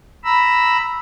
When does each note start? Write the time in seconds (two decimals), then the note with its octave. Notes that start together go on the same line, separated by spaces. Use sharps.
0.24 A#5 B5 E6